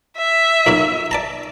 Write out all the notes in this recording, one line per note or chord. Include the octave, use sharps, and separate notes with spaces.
E5
B1 A#2 F#3
D5 A5 A#5